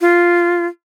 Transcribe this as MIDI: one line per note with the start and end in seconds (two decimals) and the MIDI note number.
0.01 0.66 65